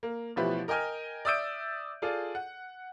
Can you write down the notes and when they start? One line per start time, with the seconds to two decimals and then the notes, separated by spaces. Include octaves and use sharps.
0.03 A#3
0.36 A1 B2 F3 E4 G4 B4
0.68 A#4 D#5 G5 G#5 F6
1.25 D5 E5 D#6 E6 G6 D7
2.02 F4 G#4 A4 D5
2.35 F#5